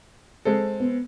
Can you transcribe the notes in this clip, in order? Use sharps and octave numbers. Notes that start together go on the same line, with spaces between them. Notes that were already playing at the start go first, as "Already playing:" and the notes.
G#3 C4 A4
B3